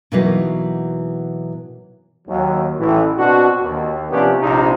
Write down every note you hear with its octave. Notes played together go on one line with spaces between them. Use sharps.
B2 E3 F#3 A#3 D#4 B4
D#2 F#3
A1 A2 E3
B2 C4 D4 F#4
D#2
C3 F3 B3 C#4 D4 G4
A#1 C3 D#4